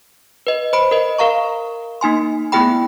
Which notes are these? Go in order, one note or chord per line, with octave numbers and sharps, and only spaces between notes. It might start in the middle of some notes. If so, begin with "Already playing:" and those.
B4 D#5
C5 B5 D7
A#4 D#5
A#4 F5 A#5 C#6
A#3 D#4 G#5 C6
A3 B3 E4 G#4 G5 B5